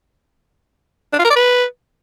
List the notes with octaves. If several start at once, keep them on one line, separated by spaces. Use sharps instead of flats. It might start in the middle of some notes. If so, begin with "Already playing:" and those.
D4
F4
A#4
D5
B4